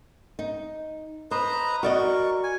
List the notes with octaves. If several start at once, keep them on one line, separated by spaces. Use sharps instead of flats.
D#4
B4 C5 D#5 A#5
F#4 A#4 D5 D#5 C#6
G#5